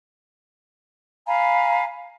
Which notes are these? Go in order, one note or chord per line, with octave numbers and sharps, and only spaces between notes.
F5 G#5 A#5 B5